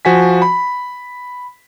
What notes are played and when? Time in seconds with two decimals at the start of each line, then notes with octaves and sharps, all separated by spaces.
0.05 F3 F#4 G#5 B6
0.42 B5